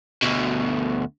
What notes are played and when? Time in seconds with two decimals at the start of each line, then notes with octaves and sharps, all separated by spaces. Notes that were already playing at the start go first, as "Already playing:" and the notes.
0.23 D2 B2